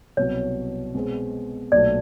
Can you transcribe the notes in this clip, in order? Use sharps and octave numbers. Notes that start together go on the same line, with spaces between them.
C2 B2 F#3 C#5
B2 G#3 C4
B1 A#2 F#3 A3 D5